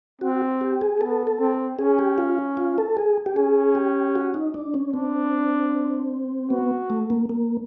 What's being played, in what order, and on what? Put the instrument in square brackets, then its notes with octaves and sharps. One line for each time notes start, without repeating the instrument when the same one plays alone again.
[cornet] C4 [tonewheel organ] F#4
[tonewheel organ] G4
G#4
[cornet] B3 [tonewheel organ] A4
[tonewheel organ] A4
[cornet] C4
[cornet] C#4 [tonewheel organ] G#4
[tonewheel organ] G4
F4
F4
A4
G#4
G4
[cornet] C#4 [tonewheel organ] G#4
[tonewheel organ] G4
F#4
D#4
D4
C#4
[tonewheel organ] C4 [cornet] D4
[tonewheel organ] B3 [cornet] F#4
[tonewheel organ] A3
A#3
A#3